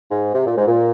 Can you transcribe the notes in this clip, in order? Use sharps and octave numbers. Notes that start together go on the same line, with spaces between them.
G#2
C3
A#2
G#2
A#2